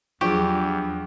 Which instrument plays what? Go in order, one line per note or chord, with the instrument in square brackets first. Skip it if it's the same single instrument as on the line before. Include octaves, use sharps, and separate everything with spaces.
[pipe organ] E2 [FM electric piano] F3 D4 G#4 [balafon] F#3 G5 C#6 [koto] G4